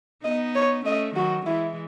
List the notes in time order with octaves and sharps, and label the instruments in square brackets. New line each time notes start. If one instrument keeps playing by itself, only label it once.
[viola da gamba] B3 D#4 [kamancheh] D#5
[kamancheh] C#5
[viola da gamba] A3 C#4 [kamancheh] D#5
[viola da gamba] D#3 F#3 [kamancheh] F#4
[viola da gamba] E3 G#3 [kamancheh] E4